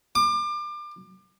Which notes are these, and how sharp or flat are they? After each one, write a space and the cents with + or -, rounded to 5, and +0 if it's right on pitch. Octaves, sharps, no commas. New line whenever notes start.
D6 +30